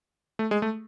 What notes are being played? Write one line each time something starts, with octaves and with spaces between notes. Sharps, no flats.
A3
G#3
A3